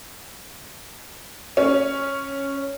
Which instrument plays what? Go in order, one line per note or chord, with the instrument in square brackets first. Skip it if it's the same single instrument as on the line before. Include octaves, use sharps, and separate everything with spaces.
[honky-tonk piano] C#4